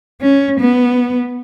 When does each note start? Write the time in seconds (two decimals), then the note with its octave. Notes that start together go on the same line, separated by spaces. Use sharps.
0.22 C#4
0.60 B3